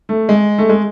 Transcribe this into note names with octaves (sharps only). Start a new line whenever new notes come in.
A3
G#3
A3
G#3